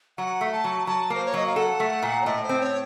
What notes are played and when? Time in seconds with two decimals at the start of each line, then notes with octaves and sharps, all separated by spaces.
0.18 F#3 F#5
0.41 A3
0.52 A5
0.64 F#3
0.87 F#3 A5
1.10 A#3 C5
1.26 C#5
1.34 F#3 D#5
1.46 F5
1.56 A4 F#5
1.80 A3
2.03 A#2
2.21 C#5
2.25 A2 D#5
2.43 C5
2.49 C4
2.60 C#5